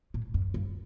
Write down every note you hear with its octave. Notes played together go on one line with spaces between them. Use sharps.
A2
F#2
G2